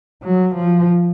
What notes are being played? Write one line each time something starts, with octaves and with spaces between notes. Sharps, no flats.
F#3
F3